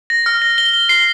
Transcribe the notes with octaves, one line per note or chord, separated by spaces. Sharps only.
A#6
F6
A#6
G7
G7
C7